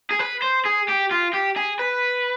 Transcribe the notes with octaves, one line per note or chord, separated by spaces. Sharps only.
G#4
B4
C5
G#4
G4
F4
G4
G#4
B4